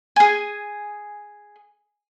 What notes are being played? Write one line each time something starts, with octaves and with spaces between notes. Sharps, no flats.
G#4 G#5